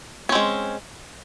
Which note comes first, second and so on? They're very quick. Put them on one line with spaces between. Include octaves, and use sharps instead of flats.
C#4 C4 G#3